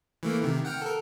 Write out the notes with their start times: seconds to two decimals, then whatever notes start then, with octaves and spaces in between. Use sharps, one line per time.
0.23 E3 A3 A#3
0.42 C3 D#3
0.65 F#5 G5 F6
0.82 A4 A#4